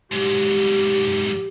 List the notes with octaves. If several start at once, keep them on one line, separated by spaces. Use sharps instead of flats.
G#2 F#3 G4